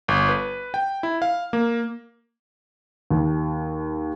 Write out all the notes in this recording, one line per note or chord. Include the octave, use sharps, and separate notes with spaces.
G1
B4
G5
E4
F5
A#3
D#2